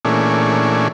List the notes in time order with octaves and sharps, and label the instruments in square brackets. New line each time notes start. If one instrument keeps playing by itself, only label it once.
[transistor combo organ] A#2 E3 A3 C#4 D4 G#4